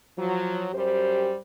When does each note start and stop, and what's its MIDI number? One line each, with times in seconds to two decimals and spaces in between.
0.18 0.67 53
0.18 0.67 54
0.73 1.36 42
0.73 1.36 55
0.73 1.36 67
0.73 1.36 72